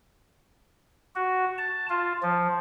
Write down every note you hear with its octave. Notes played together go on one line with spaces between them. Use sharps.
F#4
A5
F4
F3